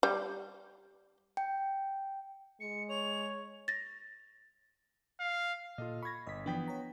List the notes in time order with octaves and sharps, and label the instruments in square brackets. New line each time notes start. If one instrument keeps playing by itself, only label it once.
[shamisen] G3
[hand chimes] G5
[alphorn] G#3 [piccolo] C#7
[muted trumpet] C#5 [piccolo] F7
[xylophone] A6 A#6
[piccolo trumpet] F5
[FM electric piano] A#2 [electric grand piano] F4 A4 D#5
[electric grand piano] B5 G#6 [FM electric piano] C#6 A#6
[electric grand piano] G1 [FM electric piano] D#5 B6
[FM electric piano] E3 F3 D4 [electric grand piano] B3 G5 B6
[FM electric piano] C#5 A#5